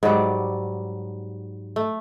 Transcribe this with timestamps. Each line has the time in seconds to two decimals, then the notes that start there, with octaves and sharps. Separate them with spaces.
0.03 G#2 F#3 G3 D5
1.76 A3